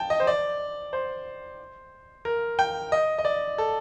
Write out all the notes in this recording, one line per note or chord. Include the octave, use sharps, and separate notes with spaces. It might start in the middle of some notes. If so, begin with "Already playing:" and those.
Already playing: G5 A5
D#5
C5
D5
C5
A#4
G5
D#5
D#5
D5
A4